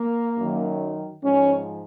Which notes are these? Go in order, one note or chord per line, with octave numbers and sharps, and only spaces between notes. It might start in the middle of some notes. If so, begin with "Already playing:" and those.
Already playing: A#3
F#2 D#3 F#3
G#2 F3 C#4